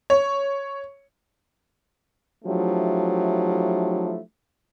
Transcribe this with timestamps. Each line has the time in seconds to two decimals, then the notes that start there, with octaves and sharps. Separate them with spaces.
0.10 C#5
2.45 F3 F#3 A3 D4 E4 G4